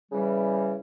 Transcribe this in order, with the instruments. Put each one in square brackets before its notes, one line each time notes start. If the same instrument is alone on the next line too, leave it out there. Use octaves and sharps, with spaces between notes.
[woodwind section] C#3 E3 G3